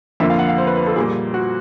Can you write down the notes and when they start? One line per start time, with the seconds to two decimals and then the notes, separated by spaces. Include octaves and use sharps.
0.20 F2 D3 F3 A#3 E5
0.30 F5
0.39 F#5
0.48 F5
0.58 C5
0.67 B4
0.77 B4
0.86 A4
0.96 A#2 G3 A#3 G#4
1.34 F#4